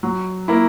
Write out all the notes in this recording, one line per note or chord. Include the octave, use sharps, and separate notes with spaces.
F#3
A#3 E4